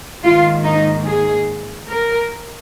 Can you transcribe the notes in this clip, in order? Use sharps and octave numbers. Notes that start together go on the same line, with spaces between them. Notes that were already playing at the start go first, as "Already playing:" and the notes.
G#2 D#3 A#3 F4
D#4
G#4
A#4